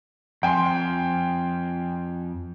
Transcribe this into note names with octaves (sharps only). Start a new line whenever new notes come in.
F2 G5 G#5 C6